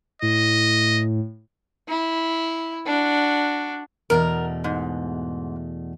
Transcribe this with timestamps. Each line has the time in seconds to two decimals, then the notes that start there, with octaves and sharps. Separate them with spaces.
0.22 A2 D#5
1.89 E4
2.86 D4 F#4
4.10 E2 B2 A3 A#4
4.64 G#2